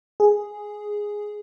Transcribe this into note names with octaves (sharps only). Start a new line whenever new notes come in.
G#4